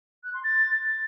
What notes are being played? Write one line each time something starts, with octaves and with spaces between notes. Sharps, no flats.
F#6
C6
A6